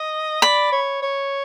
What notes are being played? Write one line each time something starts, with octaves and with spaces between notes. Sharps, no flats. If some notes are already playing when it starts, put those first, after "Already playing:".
Already playing: D#5
D5 B5
C#5
C#5